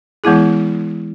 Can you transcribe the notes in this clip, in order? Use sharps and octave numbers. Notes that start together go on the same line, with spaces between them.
E3 G#3 B3 E4 G#4